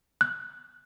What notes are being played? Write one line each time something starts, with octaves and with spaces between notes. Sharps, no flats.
F#6